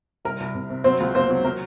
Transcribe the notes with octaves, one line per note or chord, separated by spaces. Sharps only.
C2 A#4
C2
C3
C3
F#3 C4 C5
C#2
A#3 C4 C5
F#3
F#3 A#4